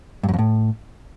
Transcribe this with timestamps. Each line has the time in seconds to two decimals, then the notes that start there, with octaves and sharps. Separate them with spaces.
0.23 G2
0.28 F#2
0.34 F2
0.39 A2